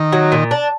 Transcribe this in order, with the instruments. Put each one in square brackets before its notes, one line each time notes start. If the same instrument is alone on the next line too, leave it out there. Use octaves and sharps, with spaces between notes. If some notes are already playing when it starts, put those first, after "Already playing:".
Already playing: [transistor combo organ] D#3
[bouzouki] F#3
A#2
D4